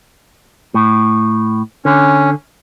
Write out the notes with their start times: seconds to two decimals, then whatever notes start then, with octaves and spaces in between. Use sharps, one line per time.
0.74 A2
1.85 D3 C#4